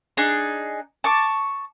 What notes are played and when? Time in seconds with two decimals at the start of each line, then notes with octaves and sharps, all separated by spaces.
0.17 D4 D#4 G#4
1.04 A5 C#6 D6